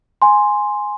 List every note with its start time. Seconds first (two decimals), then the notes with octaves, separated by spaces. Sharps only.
0.22 G#5 C6